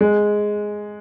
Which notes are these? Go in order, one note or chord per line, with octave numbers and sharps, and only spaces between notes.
G#3